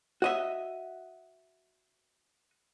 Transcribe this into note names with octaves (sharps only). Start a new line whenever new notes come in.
F#4 D#5 E5